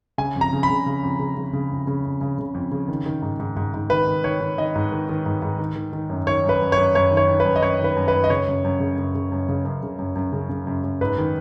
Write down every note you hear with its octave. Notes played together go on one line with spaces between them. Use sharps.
C#3 G#5
F2
A#5
C#3
B5
C#3
C#3
F2
C#3
C#3
C#3
F2
C#3
F2
C#3
C#3
F2
C#3
D#3
D#3
G#2
G#2
G#2
G#2
D#3 B4
D#3
D#3 C#5
D#3
D#3 D#5
G#2
D#3
D#3
G#2
G#2
D#3
D#3
D#3
F#2
D#3 C#5
F#2
B4
F#2
C#5
F#2
F#2 C#5
D#3
C#5
D#3
B4
F#2
D#5
F#2 C#5
D#3 B4
F#2
B4
F#2
D#5
C#3 C#5
F#2
F#2
C#3
F#2
C#3
F#2
C#3
F#2
C#3
F#2
F#2
C#3
C#3
F#2
F#2
G#2 B4
D#3